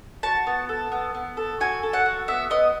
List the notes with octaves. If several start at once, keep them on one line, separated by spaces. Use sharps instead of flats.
F#4 A5
B3
A4
B3
B3
A4
F#4 G#5
A4
F#5
F#4
B3 E5
B3 D#5